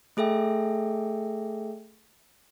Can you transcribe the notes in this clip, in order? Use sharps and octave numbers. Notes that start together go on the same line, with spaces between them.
A3 G#4 A4 E5 G5